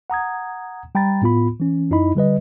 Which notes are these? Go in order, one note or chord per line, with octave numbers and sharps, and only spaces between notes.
F#5 A#5 D#6 G#6
G3 G5 A#5 B5 A6
A2 B3 F4 B5
E3 C#4
F#2 D#4 E4 D#5 B5
D3 G3 B4 D#5